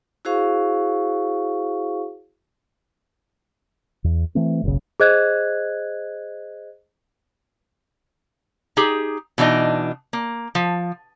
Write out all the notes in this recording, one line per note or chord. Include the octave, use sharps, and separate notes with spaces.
E4 F#4 G#4 C5 F5 C#6
E2
E3 A3 C4
F#1 B1 A#2 C#3
G#4 C5 D#5 F#6 G#6
D#4 G4 G#4
B2 E3 D4 D#4 D#5
A#3
F3